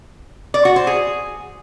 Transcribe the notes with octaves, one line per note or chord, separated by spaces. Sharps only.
D5
F#4
C5
G#4